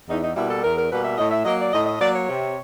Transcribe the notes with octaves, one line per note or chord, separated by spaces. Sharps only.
E2 D#4
D#4
B2 G3 A#3 E4
A4
E2 A#4
A#4
B2 G3 A#3 B4
E5
A2 D#5
E5
F#3 A#3 D#5
D5
A2 D#5
D#5
F#3 A#3 D5
C#5
C3